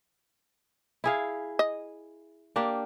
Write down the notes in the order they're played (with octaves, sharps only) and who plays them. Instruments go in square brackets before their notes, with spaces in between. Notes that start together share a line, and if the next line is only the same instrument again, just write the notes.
[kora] E4 G#4 F5
[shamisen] D#5
[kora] A#3 D4 G4